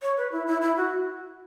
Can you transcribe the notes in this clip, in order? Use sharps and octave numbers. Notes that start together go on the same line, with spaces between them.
C#5
B4
E4
E4
E4
F#4